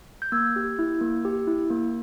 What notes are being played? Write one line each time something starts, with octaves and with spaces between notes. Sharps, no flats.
G6
A#3 E6 G#6
G4
E4
A#3
G4
E4
A#3